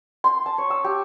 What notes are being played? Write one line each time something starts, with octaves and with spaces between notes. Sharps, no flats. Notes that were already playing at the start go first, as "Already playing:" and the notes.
C6
A5
C#5
E6
G4